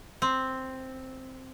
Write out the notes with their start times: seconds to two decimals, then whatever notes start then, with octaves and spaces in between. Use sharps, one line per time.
0.22 C4